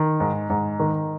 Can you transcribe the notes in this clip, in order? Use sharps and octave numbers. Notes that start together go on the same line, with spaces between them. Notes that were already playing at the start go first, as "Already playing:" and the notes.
Already playing: D#3
G#2
G#2
D#3